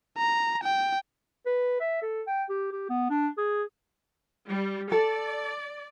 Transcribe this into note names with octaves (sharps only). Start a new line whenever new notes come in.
A#5
G5
B4
E5
A4
G5
G4
G4
B3
D4
G#4
G3
A4 D5